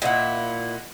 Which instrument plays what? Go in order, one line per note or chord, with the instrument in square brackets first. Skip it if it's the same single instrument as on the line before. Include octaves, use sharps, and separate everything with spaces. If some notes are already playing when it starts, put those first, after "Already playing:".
[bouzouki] A#2 E4 [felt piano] D#5 F5 F#5